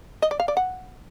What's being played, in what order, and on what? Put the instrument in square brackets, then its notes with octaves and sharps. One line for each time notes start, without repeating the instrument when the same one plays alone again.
[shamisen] D#5
D5
F5
D5
F#5